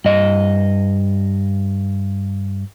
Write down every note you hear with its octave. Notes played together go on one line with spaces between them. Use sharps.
G2 D#5